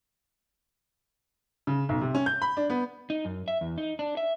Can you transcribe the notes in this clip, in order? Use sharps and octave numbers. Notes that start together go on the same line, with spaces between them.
C#3
B1
C3
C#4
G6
B5
D4
B3
D#4
F#2
E5
E2
D#4
D4
E5